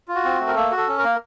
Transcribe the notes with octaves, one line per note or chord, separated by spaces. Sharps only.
F4
F#4
C4
A3
A#4
A#3 A4
F#4
A4
C#4
A#4
A#3